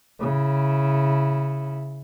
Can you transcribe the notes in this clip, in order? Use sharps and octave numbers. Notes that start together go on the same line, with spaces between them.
C#3 E4